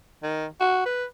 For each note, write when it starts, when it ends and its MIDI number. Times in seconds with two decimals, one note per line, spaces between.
0.23 0.46 51
0.60 0.82 66
0.86 1.05 71